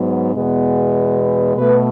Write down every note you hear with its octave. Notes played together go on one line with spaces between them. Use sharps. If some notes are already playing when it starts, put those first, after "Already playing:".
Already playing: G#2 F#3 B3
E2 B2 G#3 B3
B2 A3 B4